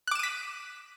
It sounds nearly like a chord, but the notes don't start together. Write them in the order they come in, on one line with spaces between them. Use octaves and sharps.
F#6 D6 E7 D#7 B6